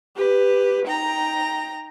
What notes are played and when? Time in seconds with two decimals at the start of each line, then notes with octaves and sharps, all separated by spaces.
0.15 G4 B4
0.85 D#4 G5 A#5